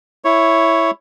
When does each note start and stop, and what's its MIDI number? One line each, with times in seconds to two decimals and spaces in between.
0.25 0.91 64
0.25 0.91 73